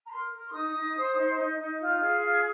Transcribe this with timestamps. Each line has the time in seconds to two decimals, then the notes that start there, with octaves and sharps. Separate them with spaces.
0.05 A#5
0.10 A#4 C6
0.32 A#4
0.44 C6
0.52 D#4 D#6
0.74 D#4
0.95 C5
1.15 D#4
1.37 D#4
1.58 D#4
1.79 F4
1.99 G#4
2.20 F4